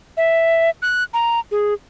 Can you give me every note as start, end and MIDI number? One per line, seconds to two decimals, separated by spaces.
0.17 0.70 76
0.82 1.04 90
1.14 1.40 82
1.51 1.74 68